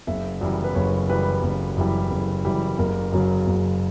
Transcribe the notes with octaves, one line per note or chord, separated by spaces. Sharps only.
F#1 E5
F#2 E3 G3 D5
B4
F#1 C#5
F#2 E3 G3 B4
F#1
F#2 E3 G3
F#1
F#2 E3 G3
F#1 A#4
F#2 C#3 F#3
F#1